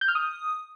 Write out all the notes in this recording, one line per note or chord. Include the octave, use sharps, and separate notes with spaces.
G6
F6
D#6